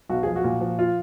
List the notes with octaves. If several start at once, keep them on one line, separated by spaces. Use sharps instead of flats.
B1 F#4
F3 G#4
F#4
A#2
F3
F4